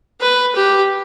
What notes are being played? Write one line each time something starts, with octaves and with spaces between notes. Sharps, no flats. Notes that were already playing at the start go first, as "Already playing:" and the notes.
B4
G4